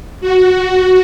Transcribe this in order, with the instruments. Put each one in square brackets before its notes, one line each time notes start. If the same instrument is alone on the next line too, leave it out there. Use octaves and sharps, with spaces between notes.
[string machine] F#4